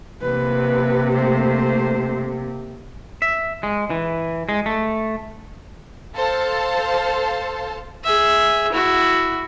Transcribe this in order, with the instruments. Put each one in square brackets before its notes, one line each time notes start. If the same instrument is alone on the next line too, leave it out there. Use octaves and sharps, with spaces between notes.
[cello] C3 A#3 [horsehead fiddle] B4
[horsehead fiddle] A3 C5
[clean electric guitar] E5
G#3
E3
G#3
A3
[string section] A4 C5 F5 A5
[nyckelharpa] G#4 E5
E4 F#4